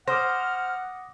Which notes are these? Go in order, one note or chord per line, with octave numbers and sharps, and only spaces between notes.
C5 F#5 D6 D#6 F6 A#6